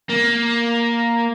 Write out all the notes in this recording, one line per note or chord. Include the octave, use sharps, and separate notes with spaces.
A#3